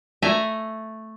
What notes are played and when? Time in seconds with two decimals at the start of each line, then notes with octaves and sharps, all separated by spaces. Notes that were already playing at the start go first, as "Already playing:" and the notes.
0.22 A3 A4 E5 G#5 A#5